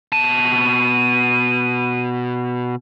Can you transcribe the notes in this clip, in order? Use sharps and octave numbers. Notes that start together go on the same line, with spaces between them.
B2 A5 D#7